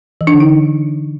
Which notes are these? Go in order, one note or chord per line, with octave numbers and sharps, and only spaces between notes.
E3
D4
D3
D#4